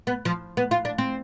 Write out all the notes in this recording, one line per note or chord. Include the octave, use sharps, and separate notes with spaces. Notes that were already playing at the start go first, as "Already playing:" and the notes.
B3
F3
B3
F4
D4
C4